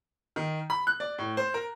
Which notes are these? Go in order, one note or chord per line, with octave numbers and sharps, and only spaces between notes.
D#3
B5
F#6
D5
A2
C5
A#4